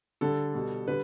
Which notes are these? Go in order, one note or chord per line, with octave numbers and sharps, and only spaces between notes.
D3 G3 A4
B2 G3
D3 G3 B4